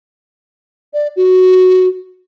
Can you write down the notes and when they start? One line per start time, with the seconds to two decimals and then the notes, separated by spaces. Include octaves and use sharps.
0.93 D5
1.16 F#4